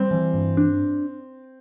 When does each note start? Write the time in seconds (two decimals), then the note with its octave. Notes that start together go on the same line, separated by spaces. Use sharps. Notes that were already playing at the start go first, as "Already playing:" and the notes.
Already playing: G3 C4
0.11 E3
0.34 G2
0.57 D4